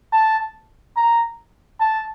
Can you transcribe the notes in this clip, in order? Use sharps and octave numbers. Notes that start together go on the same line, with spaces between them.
A5
A#5
A5